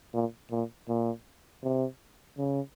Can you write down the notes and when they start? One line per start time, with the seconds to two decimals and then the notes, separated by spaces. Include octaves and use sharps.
0.13 A#2
0.51 A#2
0.88 A#2
1.63 C3
2.38 C#3